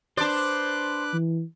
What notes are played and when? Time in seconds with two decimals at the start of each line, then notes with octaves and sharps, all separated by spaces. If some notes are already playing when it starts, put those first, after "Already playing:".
0.17 D4 B4 C5 D5 D6 F#6
1.13 E3